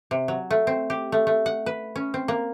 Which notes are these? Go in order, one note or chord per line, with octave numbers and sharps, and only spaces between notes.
C3
F#3
A3
C4
G4
A3
A3
F#5
B4
C#4
C4
A#3